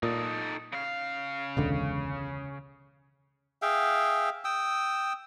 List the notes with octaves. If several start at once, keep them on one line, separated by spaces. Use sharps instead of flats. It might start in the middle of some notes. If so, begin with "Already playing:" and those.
A#2 D#4 A4
C#3 F5
E1 C#2 D3
G#4 E5 F5 G5
G5 D#6 E6